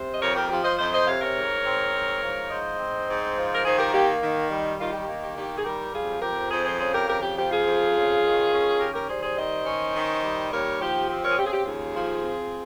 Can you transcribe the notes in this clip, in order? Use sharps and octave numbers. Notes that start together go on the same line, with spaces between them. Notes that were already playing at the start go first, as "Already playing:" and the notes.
Already playing: C3 C5
D#5
F2 A#4 C#5
G4 A#4
F3 G4
C5 D#5
F2 C5 D#5
C5 D#5
C3 C#5 F5
A#4 C#5
G#2
C4
G#2
F3
G#2 C5 D#5
C4
G#2
F3
A#4
D#3 G#4 C5
G4 A#4
A#3 G4
D#3
G3
D#3 F4
G4
A#3
G4
D#3 G4
G#4
G3 G4 A#4
F2 F4 G#4
F3 G4 A#4
F2 G#4 C5
G#4 C5
C#3 G#4 C5
G4 A#4
F2 G4 A#4
G4
F3 G4
F4 G#4
F2
C#3
D#3
C#4
D#3 G4 A#4
G4 A#4
G3 G#4 C5
G#4 C5
D#3 C5 D#5
C#4
D#3
G3
D#2 A#4 C#5
F3 G4
C4 G4
A#4 C#5
G#4
C#3 G4
G#4
G4
D#2 F4 G#4
F3
C4